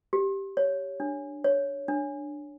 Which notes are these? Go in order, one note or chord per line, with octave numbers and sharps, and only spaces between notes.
G4
C#5
D4
C#5
D4